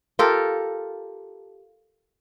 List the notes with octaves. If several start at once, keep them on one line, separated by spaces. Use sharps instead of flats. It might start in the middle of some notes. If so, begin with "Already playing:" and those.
F4 G4 A4 A#4